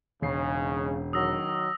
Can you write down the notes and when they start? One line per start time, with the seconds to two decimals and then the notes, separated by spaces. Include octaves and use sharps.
0.22 E1 G#2 C#3 C7
1.13 D#3 F#3 D#6 E6 A#6